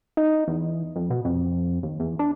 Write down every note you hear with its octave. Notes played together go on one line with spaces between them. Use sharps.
D#4
E2
F2
B2
F2
D#2
E2
D4